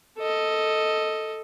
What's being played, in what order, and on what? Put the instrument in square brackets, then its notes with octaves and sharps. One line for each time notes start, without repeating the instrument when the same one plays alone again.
[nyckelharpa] A4 D#5